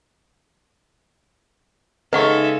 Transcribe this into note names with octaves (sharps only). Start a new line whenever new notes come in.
C#3 G#3 D#4 A4 B4 E5 F#5 C#6